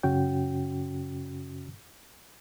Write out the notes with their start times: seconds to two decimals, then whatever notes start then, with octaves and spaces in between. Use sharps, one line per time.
0.03 F#2 C#3 C#4 F#4 G5